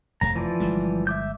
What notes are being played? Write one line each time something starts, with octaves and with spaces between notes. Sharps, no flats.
F1 F2 A3 A#5
E3 F3 D5
G1 G3 G#3
E5 D6 G6